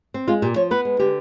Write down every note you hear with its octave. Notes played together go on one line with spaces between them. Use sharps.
C4
G#3 F4
A#2 G4
F3 C#5
B3 B4
G#3
D3 G4